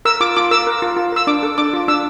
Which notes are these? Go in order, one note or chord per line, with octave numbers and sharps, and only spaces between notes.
A#4 E6
F4 D6
F4 D6
A#4 E6
A#4
F4
F4
A#4 E6
D4 D6
A4
D4 D6
F4
D4 E6